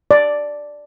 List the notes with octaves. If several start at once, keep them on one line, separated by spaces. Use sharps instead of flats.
D5